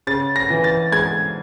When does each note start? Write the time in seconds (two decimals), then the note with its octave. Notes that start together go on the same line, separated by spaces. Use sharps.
0.07 C#3 A6
0.36 A#6
0.50 E3
0.64 A6
0.92 G#3 G#6